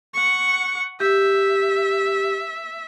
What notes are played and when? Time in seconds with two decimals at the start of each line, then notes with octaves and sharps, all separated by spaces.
0.14 F#5 C#6
1.00 G4 E5